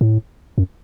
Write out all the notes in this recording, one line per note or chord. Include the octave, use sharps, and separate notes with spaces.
A2
F#2